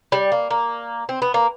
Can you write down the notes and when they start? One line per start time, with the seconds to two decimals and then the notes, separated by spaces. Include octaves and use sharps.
0.12 G3
0.32 A#3
0.51 A#3
1.09 C4
1.22 B3
1.34 A#3